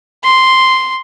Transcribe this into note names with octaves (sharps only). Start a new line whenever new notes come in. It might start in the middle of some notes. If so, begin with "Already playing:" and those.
C6